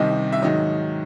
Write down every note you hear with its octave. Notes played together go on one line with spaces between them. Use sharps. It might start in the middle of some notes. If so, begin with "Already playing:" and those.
Already playing: C2 C3 D#3 D#5
E5
G#2 D#3 F#3 D#5